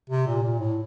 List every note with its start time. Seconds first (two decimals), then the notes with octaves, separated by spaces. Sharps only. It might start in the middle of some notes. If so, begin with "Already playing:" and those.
0.10 C3
0.27 A#2
0.42 A#2
0.60 A2